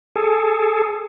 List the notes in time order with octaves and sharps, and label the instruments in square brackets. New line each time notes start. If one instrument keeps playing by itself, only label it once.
[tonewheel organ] G#4 A4